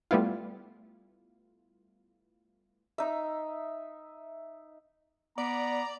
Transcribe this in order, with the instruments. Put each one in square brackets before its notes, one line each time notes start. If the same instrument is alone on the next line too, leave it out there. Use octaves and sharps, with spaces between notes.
[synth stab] G3 A3 B3 E4 F4
[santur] D#4 E5
[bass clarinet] B3 [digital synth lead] D5 [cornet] A#5